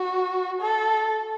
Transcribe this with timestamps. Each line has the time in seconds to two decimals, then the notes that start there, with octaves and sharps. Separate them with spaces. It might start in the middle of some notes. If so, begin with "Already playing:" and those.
Already playing: F#4
0.61 A4